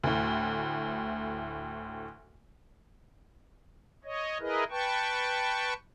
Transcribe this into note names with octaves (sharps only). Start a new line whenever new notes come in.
D2 A2
C#5 D#5
E4 G#4 A#4 B4 D#5
B4 G5 A5 C#6